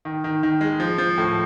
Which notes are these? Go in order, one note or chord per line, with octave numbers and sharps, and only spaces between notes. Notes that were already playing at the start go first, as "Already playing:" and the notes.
D#3
D#3
D#3
G#3
F3
F3
A2